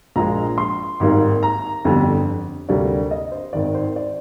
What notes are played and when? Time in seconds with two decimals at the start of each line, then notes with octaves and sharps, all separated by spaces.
0.16 A#1 A#2 F3 G#3 A#5
0.58 C6
1.00 G#1 G#2 G3 A#3
1.43 A#5
1.84 G1 F2 D3 G3
2.69 D2 C3 G3 A#3 D5
3.11 D#5
3.32 C5
3.53 G#1 G#2 D#3 D5
3.75 C5
3.96 D5